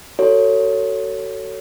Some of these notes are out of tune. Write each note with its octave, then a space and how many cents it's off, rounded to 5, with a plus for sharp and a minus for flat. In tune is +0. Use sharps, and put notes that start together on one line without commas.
F#4 +35 A4 +35 C#5 +10